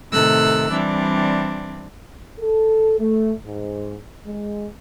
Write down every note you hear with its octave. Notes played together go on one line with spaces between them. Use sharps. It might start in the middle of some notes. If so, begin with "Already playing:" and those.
A2 C3 D#3 A4 E6 F#6
E3 G3 C4 D4
A4
A3
G#2
G#3